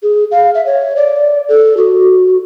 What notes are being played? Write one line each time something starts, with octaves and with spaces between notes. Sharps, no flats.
G#4
F5
E5
C#5
D5
A4
F#4